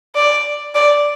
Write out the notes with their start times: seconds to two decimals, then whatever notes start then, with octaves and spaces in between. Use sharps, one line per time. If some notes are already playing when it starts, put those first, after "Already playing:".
0.15 D5
0.75 D5